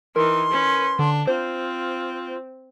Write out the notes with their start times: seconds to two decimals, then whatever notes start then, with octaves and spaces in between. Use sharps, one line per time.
0.16 E3 D#4 A#4 C6
0.51 C#4 B4
0.99 D3 D4
1.27 C4 F4 C5